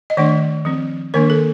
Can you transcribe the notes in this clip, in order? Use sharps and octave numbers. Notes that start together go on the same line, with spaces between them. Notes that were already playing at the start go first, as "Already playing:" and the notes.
D#5
D#3 A3 D4 D5
F3 C4
D#3 A#3 D4 A#4
A4